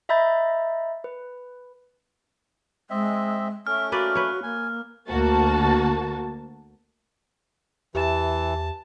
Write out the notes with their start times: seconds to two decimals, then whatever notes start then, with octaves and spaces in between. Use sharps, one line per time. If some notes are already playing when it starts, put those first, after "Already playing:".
0.09 D#5 E5 A#5 B5 G6 A6
1.04 B4
2.90 G#3 C4 D#5 E5
3.67 A3 C#4 E5 F6
3.92 A#3 F#4 B4 D5
4.15 B4 C#5
4.43 A#3 G#5
5.09 D2 A#3 F#4 A5
7.95 E2 E3 G4 E5 A5 E7